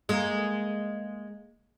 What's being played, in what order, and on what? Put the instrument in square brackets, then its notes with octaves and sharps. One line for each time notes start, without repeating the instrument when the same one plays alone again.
[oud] G#3 A#3